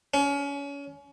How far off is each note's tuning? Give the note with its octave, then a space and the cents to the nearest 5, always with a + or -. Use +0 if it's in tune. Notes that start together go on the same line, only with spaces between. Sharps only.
C#4 +30